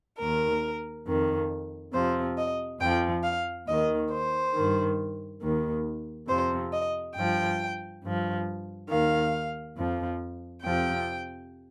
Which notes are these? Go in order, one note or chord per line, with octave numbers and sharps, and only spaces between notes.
D#2 D#3 A#4
F2 D#3
F2 C3 F3 C5
D#5
F2 F3 G5
F5
D#2 D#3 D#5
C5
G2 D#3
D#2 D#3
F2 C3 F3 C5
D#5
G2 F3 G5
G2 F3
D#2 D#3 F5
F2 F3
F2 C3 F3 G5